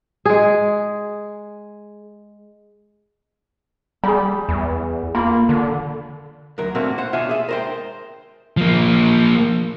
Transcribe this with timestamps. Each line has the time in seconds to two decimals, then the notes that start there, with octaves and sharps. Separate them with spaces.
0.25 G#3 G#4
4.04 G3 G#4 B5
4.49 E2
5.15 A#3 F4 B5
5.49 D3
6.58 D2 F#3 A#4
6.75 A#2 A3 A#3 C4 D4 F#4
6.98 C5 F#5
7.13 B2 D4 F4 C#5 E5 G#5
7.29 G#4 E5
7.49 A#4 C5 G5
8.57 F3 A#3